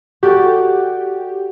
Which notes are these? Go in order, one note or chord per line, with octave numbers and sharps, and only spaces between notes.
F#4 G4 A4 D5